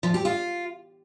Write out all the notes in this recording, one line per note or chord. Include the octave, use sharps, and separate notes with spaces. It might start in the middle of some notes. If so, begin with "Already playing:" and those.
F3
G4
F4